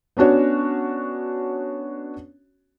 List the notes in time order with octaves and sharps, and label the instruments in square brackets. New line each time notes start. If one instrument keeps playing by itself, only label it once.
[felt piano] B3 C#4 D4 F#4 C#5